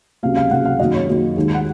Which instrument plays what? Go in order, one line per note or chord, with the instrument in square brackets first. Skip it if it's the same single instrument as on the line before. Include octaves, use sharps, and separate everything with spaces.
[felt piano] C#2 C3 F#3 A#3 F5
F5
C#2 C3 F#3 A#3 F#5
F5
F#2 D#3 A#3 D#5
C#5
F#2 D#3 A#3
D#2 D#3 G#3
F#5